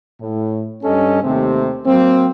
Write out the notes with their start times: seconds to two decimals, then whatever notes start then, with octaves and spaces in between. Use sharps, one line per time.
0.21 A2
0.83 G2 C#4 A4 D#5
1.22 D#2 C3 A3 C4
1.86 F#3 A#3 C4